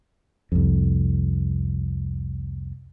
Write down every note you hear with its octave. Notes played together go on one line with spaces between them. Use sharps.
C2 F2